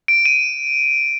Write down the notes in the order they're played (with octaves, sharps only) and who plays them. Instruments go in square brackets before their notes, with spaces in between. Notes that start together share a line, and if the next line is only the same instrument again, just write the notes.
[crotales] D7
D#7